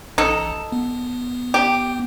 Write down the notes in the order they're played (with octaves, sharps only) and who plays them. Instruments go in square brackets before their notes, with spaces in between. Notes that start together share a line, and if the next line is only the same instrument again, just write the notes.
[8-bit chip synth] A1 A#5 [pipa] D#4 A4
[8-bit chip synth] B3
[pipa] G4